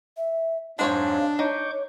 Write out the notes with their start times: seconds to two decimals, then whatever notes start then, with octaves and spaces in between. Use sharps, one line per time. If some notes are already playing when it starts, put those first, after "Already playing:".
0.17 E5
0.79 F2 G#2 F#3 G#3 D4 C5 C#5 F5
1.39 D#4 C#5 C#6 D6 G6